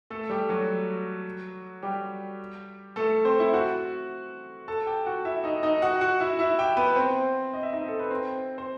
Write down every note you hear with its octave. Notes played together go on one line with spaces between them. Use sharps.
A3 A4
G3 G4
F#3 F#4
G3 G4
A3 A4
C4 C5
E4 E5
F#4 F#5
A4 A5
G4 G5
F#4 F#5
E4 E5
D#4 D#5
D#4 D#5
F#4 F#5
F#4 F#5
E4 E5
E4 E5
G4 G5
B3 B4
C4 C5
D#5
E5
D#4 D#5
A4
B4
C4 C5
C5